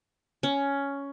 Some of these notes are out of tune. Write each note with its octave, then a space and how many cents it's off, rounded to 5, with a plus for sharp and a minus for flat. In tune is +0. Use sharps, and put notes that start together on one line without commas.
C#4 +10